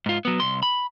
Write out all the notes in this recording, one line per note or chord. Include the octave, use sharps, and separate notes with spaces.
G#2 F4
F#3 B3
C2 C6
B5